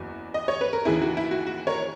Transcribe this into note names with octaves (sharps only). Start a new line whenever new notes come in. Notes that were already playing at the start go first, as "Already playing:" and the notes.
Already playing: F#1 E2 E3 F#4
D#5
C#5
B4
A#4
D#2 C#3 E3 E4 G#4
F#4
E4
F#4
F#4
A#4 C#5